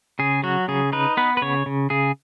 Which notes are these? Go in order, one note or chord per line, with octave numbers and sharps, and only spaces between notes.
C#3 G#4
F#3 F#4
C#3 G#4
D#4 B4
B3 B4
B4
C#3 C#5
C#3
C#3 G#4